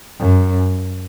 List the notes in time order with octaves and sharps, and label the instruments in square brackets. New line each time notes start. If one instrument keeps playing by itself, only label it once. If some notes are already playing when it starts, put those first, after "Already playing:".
[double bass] F#2